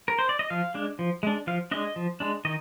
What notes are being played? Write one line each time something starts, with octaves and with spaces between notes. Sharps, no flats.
A#4
C5
D5
D#5
F3 F5
G#3 D4
F3
G#3 D4
F3 F5
G#3 D4 D#5
F3
G#3 D4
D#3 D#5